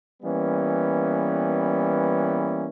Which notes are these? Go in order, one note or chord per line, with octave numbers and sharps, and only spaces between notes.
E3 G3 A#3 B3 C#4